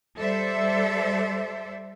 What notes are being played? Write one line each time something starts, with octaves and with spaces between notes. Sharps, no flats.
G3 A4 C5 D5 E5